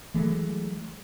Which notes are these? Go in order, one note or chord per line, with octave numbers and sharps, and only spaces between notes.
E3 F#3 G#3 A3